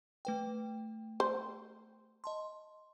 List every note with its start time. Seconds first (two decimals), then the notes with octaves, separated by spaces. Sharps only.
0.25 A3 B4 G5
1.20 C5
2.24 D#5 A5 C6